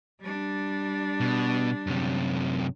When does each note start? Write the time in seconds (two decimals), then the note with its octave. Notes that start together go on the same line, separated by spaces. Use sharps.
0.21 G3 D4
1.20 B2
1.87 F#2 C3